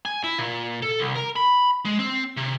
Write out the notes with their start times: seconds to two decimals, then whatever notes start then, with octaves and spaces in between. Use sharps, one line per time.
0.05 G#5
0.24 E4
0.38 A#2
0.82 A4
1.00 C2
1.15 A#4
1.36 B5
1.85 G#3
1.99 C4
2.37 C3